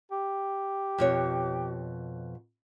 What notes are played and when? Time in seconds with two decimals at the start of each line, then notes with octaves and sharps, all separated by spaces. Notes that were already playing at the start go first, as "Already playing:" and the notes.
0.12 G4
0.98 F2 B2 C#5